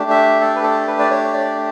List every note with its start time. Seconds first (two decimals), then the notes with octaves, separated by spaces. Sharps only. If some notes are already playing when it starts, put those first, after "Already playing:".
Already playing: A3 D4 G4
0.10 E5
0.41 A4
0.55 B4
0.63 A4
0.87 B4
0.99 D5
1.10 C#5
1.33 D5